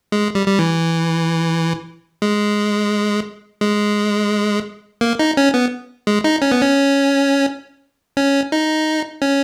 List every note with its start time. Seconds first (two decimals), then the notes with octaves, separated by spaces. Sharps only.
0.12 G#3
0.35 G3
0.47 G3
0.59 E3
2.22 G#3
3.61 G#3
5.01 A#3
5.19 D#4
5.37 C#4
5.54 B3
6.07 G#3
6.24 D#4
6.42 C#4
6.52 B3
6.62 C#4
8.17 C#4
8.52 D#4
9.22 C#4